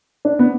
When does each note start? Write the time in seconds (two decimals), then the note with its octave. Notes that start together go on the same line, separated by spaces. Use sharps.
0.25 D4
0.39 B3